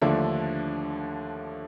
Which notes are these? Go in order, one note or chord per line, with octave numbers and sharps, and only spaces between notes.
D#2 D3 F3 A3 D4 E5